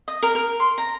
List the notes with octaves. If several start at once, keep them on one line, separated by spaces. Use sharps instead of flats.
D#5
A#4
A#4
C6
A#5